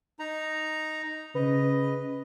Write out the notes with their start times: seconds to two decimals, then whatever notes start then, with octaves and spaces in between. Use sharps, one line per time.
0.19 D#4 A#5
1.35 C#3 B4 D#5